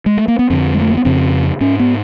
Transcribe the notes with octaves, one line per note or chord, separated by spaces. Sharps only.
G#3
A3
A#3
B3
F2 D3 C4
G#3
A3
A#3
B3
F2 C#3 C4
G#2 C#4
B3